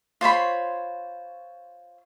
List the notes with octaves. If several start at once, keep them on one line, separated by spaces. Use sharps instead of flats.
F4 C5 C#5 B5